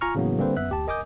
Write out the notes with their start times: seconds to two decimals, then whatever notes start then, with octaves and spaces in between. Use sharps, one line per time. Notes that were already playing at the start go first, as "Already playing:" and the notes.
0.01 F4 G#5 A#5 C#6 F6
0.15 A2 C#3 E3 F#3 A#3 B3
0.38 D3 G3 A#3 C4 B4 C5
0.57 F#2 B3 E5 F#6
0.69 D2 G4 A5
0.87 A#4 D#5 G#5 D6 D#6 G6